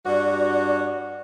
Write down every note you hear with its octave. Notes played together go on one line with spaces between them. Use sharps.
G2 F#4 D5